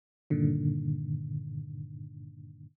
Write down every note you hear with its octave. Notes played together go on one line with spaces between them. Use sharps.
G2 A#2 D3 D#3